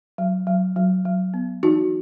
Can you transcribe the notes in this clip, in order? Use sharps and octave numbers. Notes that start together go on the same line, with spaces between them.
F#3
F#3
F#3
F#3
B3
E3 D#4 F#4